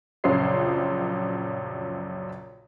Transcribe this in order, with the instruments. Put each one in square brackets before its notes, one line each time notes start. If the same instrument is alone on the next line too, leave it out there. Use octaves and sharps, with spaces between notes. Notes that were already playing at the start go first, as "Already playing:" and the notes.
[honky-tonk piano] A#1 F#2 C#3 F4 C5 C7